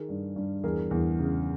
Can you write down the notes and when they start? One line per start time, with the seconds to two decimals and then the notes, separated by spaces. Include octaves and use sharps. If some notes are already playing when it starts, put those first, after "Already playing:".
Already playing: D#3 G#4 A#4
0.09 G2
0.36 G2
0.63 E2 G#4 A#4
0.91 E2
1.19 C#3